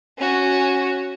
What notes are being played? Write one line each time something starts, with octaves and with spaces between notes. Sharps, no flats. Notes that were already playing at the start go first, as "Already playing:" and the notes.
C#4 F#4